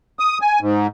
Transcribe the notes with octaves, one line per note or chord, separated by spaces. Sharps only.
D#6
G#5
G#2